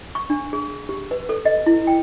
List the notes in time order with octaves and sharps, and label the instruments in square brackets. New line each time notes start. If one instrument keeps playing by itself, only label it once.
[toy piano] C#6
D4
G#4
G4
B4
A4
D#5
E4
G5